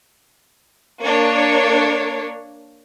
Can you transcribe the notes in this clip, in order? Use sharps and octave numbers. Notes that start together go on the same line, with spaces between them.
A#3 D4 C#5